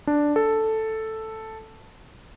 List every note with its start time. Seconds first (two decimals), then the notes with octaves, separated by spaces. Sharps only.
0.07 D4
0.36 A4